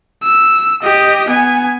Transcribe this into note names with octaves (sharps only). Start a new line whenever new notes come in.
E6
G4 D#5
B3 G#5